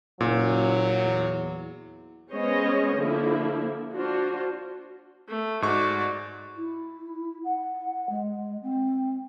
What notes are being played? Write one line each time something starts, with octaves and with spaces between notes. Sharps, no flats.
F#1 A#2 F#3
E2
G#3 B3 C#4 C5 C#5 D#5
D3 F3 A#3 E4
D4 F4 F#4 C5
A3
G#2 F#4 D5 C#6
E4
F#5
G#3
C4